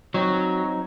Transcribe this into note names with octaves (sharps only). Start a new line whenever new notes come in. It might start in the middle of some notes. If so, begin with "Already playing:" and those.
F#3 C4 D#4 C#5